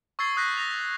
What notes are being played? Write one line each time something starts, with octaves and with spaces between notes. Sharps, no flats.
C#6 E6 G#6 A6 C7 G7
D#6 E6 F#6 G6 A#6 B6
D#6 A#6 F7